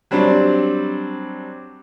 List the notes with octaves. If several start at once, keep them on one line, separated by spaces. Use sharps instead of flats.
F#3 G3 C4 D4